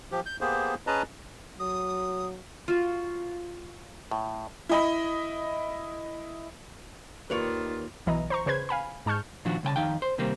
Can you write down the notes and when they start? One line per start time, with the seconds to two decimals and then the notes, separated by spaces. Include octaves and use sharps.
0.12 F3 G4
0.26 G6
0.41 A#3 B3 G4 G#4 C5
0.87 C#4 G#4 B4 D#5 A5 A#5
1.60 F#3 D#6
2.68 F4 F#4
4.11 A2
4.69 E4 D#5 B5
7.30 D#2 D#3 A#3 F4 B4 C#5 D5 F7
8.06 B1 E3 D#5 A#5
8.30 C5 A#5 C#6
8.46 C#3 B4 C5 G#6
8.69 F5 G#5 B5
9.06 G#2 A5 C#6 F6 G6
9.45 A#2 D#3 F3 D4 F#4
9.63 C2 C#3 G5 A5
9.76 F2 B2 D#3 D#4 F5 G5
10.02 C5
10.18 D#2 C3 G3 A#3 C4